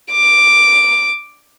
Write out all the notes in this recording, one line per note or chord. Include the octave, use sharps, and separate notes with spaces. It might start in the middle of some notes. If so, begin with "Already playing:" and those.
D6